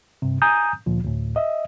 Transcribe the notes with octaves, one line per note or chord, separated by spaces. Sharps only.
G2 C3
G#5 A#5 D#6 G6
D2 A#2 F3
D2 A2
D#5 E5